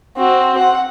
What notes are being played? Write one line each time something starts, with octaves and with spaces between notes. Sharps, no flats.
C4 F#4
F#5